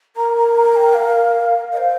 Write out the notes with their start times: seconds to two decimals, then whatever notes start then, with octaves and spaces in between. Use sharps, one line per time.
0.16 A#4 A#5
0.37 A#5
0.55 A#5
0.76 G5
0.94 F5
1.72 D#5
1.77 C5